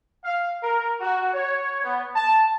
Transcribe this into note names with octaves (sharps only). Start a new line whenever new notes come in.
F5
A#4
F#4
C#5
B3
A5